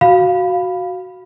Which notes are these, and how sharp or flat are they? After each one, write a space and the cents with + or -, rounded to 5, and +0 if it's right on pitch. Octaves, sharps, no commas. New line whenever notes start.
F#4 +0 F5 +0 B5 +5